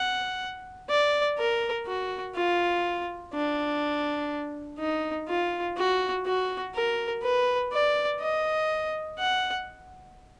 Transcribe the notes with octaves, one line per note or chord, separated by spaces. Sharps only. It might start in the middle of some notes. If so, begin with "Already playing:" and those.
Already playing: F#5
D5
A#4
F#4
F4
D4
D#4
F4
F#4
F#4
A#4
B4
D5
D#5
F#5